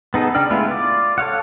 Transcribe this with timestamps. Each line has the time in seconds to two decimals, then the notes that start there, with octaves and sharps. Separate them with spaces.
0.14 B3 D#4 G#4 A4
0.35 C#3 D4 D5 G5 F6
0.50 G#3 A3 B3 E4 F4
0.67 F4 D5
1.18 A4 C#5 F5 F#5